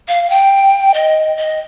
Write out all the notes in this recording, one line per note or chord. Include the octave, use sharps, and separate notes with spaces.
F5
G5
D#5
D#5